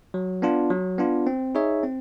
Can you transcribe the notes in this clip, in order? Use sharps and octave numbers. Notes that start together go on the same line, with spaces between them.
F#3
B3 D4 F4
F#3
B3 D4 F4
C4
D#4 G#4 C#5 E5
C4